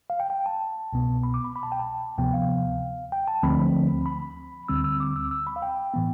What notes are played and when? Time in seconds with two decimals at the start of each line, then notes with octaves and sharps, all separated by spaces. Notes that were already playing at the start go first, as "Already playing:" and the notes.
0.10 F5
0.20 G5
0.30 G5
0.46 A5
0.93 C2 B2 B3
1.23 B5
1.34 D6
1.44 B5
1.56 B5
1.63 A5
1.72 G5
1.80 A5
2.18 D2 C3 F3 B3 G5
2.34 F5
3.12 G5
3.28 A5
3.43 D2 D3 F3 A3 C4 B5
4.06 B5
4.68 D2 D3 G3 C4 E6
4.84 E6
5.00 D6
5.16 E6
5.31 E6
5.47 B5
5.56 F5
5.62 G5
5.94 A2 E3 B3